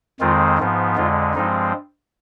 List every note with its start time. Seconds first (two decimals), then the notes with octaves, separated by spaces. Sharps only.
0.20 F2 D#3 G#3 C4 F4
0.58 G#2 F3 B3
0.96 F2 D3 G#3 F4
1.34 G2 F3 G#3 C4 D#4